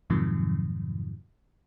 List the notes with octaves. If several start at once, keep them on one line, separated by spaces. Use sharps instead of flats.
F2 G#2 C3 D#3 F3 F#3